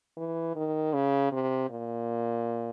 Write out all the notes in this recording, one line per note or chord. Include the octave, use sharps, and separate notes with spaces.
E3
D#3
C#3
C3
A#2